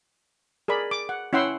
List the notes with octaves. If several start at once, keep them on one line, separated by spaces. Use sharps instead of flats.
G#4 A#4 D5 B5
D6
F#5
C#4 E4 F#5 G5 C6 E6